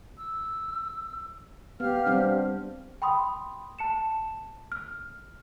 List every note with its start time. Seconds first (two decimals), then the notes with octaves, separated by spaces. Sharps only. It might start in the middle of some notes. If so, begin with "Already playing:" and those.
0.18 E6
1.80 B3 G4 F5 F6
2.06 G3 C4 D4
3.02 G5 B5 C6 D#6
3.79 A5 C#7 E7
4.72 F6